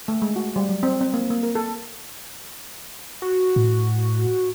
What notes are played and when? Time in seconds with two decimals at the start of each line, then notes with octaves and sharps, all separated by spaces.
0.08 A3
0.22 G#3
0.36 F#4
0.56 G3
0.69 F#3
0.83 C4
1.01 C4
1.14 A#3
1.30 A#3
1.43 A#4
1.55 A4
3.22 F#4
3.56 A2